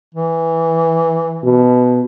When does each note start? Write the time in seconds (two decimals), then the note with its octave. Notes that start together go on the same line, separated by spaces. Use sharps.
0.15 E3
1.44 B2